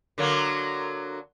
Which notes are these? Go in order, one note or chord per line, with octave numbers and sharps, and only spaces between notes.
D3 F#3 A#3